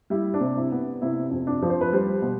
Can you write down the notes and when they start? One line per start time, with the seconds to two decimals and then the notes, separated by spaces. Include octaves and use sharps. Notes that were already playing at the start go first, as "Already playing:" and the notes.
0.10 G3 E4
0.34 D4
0.40 C3
0.57 E4
0.72 B3
1.02 C3 E4
1.31 F2
1.47 D4
1.62 F3
1.70 C5
1.81 B4
1.93 G3 C5
2.22 B2